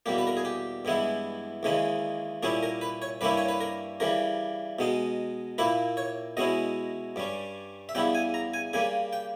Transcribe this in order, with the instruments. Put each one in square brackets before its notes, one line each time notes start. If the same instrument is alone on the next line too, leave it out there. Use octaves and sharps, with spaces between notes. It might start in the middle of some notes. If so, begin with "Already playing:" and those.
[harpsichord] E2 B2 G3 A#3 G4
B4
A#4
G#4
G4
G2 E3 G#3 B3 E4
D#2 C#3 E3 G#3 D#4
A#2 G3 C#4 E4 G#4
A#4
B4
C#5
G2 G3 A#3 C#4 E4 B4
C#5
B4
A#4
C#3 E3 G3 A#4
B2 G#3 D#4
A#2 A#3 E4 B4
C#5
B2 G#3 C#4 E4 D#5
G2 G3 C#4
E5
E2 C#3 G3 B3 E4 G5
G#5
A#5
G#5
C#3 G3 A#3 G#5
G5